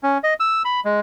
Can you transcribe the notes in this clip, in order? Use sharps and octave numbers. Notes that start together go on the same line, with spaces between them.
C#4
D#5
E6
B5
G#3